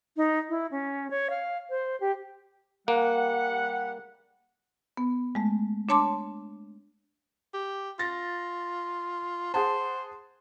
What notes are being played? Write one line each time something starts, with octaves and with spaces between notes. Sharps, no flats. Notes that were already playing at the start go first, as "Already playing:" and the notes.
D#4
E4
C#4
C#5
F5
C5
G4
G3 A#3 F#5
B3
G#3 A3
D4 C#5 A5 C6 D6
G4
F4 A6 A#6
G#4 C5 F#5 A5